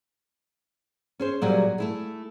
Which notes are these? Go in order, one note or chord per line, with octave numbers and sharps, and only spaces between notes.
C#4 G#4 C5
A#2 F#3 G3 G#4
A3 E4 G#4